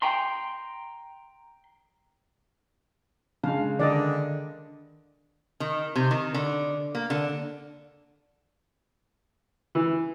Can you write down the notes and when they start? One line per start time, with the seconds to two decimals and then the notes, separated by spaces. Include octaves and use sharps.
0.02 G5 A#5 C6
3.43 C#3 G#3 D4 F5
3.79 D3 D#3 D4 D5 D#5
5.60 D#3
5.96 C3
6.11 D#3
6.34 D3
6.95 A#3
7.10 D3
9.75 E3